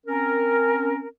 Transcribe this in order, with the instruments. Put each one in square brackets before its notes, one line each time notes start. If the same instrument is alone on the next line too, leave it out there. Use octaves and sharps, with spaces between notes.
[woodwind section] C4 C#4 A#4